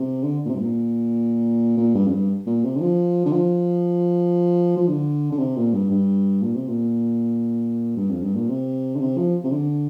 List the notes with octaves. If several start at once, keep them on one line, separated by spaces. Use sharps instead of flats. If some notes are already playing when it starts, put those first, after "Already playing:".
Already playing: C3
D3
A#2
C3
G2
A#2
A#2
G2
F2
G2
A#2
C3
D3
F3
D3
F3
F3
D3
D3
C3
A#2
G2
G2
A#2
C3
A#2
G2
F2
G2
A#2
C3
D3
C3
F3
C3
D3